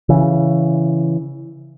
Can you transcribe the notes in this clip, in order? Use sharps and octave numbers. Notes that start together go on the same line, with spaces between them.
C#3 E3